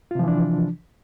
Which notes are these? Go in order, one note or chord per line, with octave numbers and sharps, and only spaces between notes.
C3 E3 F3 D4 F4